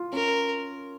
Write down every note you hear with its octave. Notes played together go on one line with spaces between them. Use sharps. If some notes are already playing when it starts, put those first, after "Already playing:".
Already playing: F4
C#4 A#4